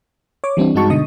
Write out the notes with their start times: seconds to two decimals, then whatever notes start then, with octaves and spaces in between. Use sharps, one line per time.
0.44 C#5 D6
0.57 E3 G3 C4 D4 E4
0.75 G2 G#3 D#4 F#4 A5 C#6
0.90 B2 D3 D#5 D#6